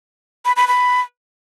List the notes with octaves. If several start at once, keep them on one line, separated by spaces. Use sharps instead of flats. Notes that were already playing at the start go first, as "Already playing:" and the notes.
B5
B5
B5